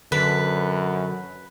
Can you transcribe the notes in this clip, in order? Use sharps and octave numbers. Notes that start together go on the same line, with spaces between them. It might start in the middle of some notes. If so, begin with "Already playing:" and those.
F#2 D3 B4